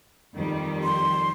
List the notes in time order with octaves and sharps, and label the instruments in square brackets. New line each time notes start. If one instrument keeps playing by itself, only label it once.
[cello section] F2 D#3 G3
[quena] C6